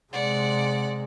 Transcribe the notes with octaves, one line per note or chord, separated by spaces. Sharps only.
C3 G#3 D5 F#5